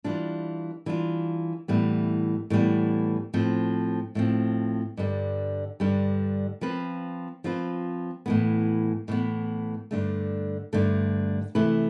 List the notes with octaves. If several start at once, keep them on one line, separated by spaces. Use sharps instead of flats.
E3 G3 D4 F4
E3 G3 D4 F4
A2 E3 G3 B3
A2 E3 G3 B3
A2 F3 C4
A2 F3 C4
G2 D3 G3
G2 D3 G3
F3 C4 F4 B4
F3 C4 F4 B4
A2 E3 B3
A2 E3 B3
G2 D3 A3
G2 D3 A3
C3 E3 A3 E4 B4